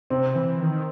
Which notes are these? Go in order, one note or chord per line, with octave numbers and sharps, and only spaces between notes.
C3 C4
E3
D#3